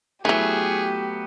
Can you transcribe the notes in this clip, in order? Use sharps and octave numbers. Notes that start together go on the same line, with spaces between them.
D#3 E3 F#3 A3 B3 G4 G#4